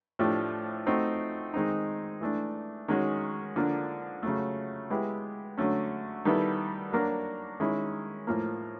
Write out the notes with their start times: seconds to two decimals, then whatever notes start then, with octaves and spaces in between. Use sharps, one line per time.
0.19 A2 F3 A3 D4 G4
0.86 A3 C4 D#4 F#4
1.53 D#3 G#3 C4 D#4
2.21 E3 A3 D4
2.88 D#3 G#3 C#4 F#4
3.56 D3 F3 A#3 D4
4.23 C#3 F#3 A3
4.90 G#3 B3 E4 G4
5.57 D3 F#3 A3 C#4
6.25 D#3 G3 B3 E4 A4
6.92 F#3 A#3 D4 F#4 A#4
7.60 D#3 G#3 C#4 E4
8.27 A2 F3 A#3